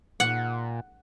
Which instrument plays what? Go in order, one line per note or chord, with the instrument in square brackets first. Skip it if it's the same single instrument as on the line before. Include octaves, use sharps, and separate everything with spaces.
[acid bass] A#2 [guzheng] F#5